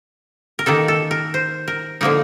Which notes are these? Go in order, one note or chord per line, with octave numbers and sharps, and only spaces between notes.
A#4
D#3 A#3 D#4 A4
A4
A#4
C5
A#4
D3 F3 A#3 D#4 A#4